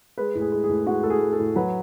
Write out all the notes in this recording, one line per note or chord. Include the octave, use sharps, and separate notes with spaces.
G#3 B4
A2
G#4
G#3
G#4
A2
G#3 F#4
A2 A4
G#4
G#3
A4
A2
F#3 B4